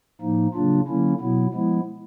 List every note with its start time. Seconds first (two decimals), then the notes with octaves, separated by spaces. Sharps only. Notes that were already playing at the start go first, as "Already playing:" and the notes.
0.21 A2 F3 A#3 D#4
0.54 C#3 F#3 A#3 D4 F4
0.87 D3 F#3 A#3 C#4 E4
1.20 B2 F#3 B3 E4
1.54 F3 G#3 B3 E4